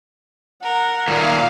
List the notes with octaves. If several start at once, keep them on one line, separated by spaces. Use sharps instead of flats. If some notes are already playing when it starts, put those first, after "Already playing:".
A#4 F#5
D#2 A#2 A#3 F5